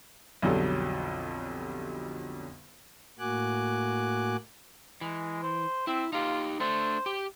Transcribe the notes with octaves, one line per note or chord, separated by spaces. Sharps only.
B1 F2 D3 F#3 G3 A4
A2 A#3 F#4 G#5 D6 F#6
E3 G#3
C5
C4 E4
D#4 F4 G4
A3 D4 C5
G4